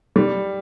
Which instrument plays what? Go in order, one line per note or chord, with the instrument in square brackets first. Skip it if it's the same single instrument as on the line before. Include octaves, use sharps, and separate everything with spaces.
[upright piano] G3